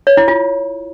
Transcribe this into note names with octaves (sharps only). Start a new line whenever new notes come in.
C#5
E4
F4